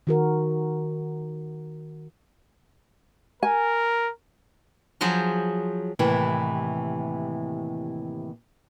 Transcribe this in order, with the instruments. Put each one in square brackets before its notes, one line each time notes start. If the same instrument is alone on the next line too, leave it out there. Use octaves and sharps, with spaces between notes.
[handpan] D#3 F#4 A#4
[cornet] A#4 [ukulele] G#5
[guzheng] F3 F#3 G#4 C5
[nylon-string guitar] D#2 A2 C3 E3